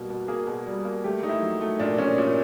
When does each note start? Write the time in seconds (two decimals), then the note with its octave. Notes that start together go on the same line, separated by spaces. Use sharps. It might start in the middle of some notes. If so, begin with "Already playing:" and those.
Already playing: B2 G3 A#3
0.10 B2
0.28 A#3 G#4
0.47 B2
0.67 G3
0.85 A#3
1.04 A3 G4
1.23 A3 D#4
1.29 E4
1.42 F#3
1.61 A3
1.79 A#2 D4
1.98 A#2 C#4
2.18 A#2